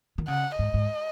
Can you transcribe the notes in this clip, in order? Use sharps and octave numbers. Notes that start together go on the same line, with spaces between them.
D#3
C#3 F#5
G#2 D#5
G#2